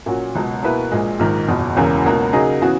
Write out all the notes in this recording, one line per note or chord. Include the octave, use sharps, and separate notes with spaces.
A#2 F#3 C#4 F#4
C#2 B2 F#3
B2 A#3 E4 B4
A#1 A#2 G#3
A#1 G#2 D#3
F#1 E2 B2
E1 E2 C#3 E3 A#3
C#2 B2 A#3 C#4 F#4
C#3 F#3 A#3 D#4 G#4
C#3 E3 B3 F#4